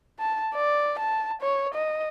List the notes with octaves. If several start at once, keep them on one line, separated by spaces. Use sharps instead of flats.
A5
D5
A5
C#5
D#5